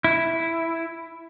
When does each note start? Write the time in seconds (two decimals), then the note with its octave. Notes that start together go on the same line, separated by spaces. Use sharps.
0.04 E4